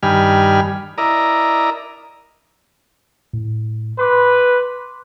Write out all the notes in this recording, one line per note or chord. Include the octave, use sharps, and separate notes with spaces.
G2 D#3 G3 G#5 B5 F6
E4 A#4 D5 D#5 A#5
A2
B4 C6 D6